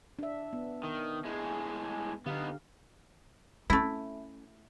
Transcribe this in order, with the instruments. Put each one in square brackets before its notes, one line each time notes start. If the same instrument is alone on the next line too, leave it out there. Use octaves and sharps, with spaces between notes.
[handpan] D4 E5
B3
[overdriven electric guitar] D#3
A2 G#3
[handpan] D3 G4 F5 [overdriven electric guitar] B3 D#4
[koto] A3 E4 [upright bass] C#4